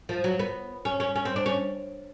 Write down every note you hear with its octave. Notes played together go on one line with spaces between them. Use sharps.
F3
F#3
B3
C#4
C#4
C#4
C4
D4
C#4